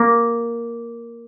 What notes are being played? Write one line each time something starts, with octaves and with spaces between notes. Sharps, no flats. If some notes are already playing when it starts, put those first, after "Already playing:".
Already playing: A#3